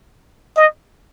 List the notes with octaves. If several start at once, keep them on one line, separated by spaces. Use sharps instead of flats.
D#5